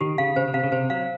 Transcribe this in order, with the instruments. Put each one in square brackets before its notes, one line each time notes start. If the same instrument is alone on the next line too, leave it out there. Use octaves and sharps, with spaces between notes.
[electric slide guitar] D#3 [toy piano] G4
[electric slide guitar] C#3 [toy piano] F5
[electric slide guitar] C#3 [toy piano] C5
[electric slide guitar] C#3
[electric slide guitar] C3 [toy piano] F5
[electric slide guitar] C#3
[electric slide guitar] C3 [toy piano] C5
[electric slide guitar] F#3 [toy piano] F5